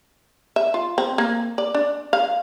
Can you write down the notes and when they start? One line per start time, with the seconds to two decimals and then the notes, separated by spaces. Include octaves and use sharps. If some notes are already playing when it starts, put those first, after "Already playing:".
0.56 E5
0.74 F4
0.98 C4
1.18 A#3
1.58 D5
1.74 D4
2.13 F5